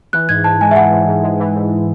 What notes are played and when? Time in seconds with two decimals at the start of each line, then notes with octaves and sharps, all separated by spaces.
0.13 E3 F#6
0.29 G#2 G#6
0.44 G#2 A5
0.61 G#3 G#5
0.71 E5
0.76 E3 F#5
0.93 G#2
1.08 G#2
1.23 G#3
1.40 E3
1.55 G#2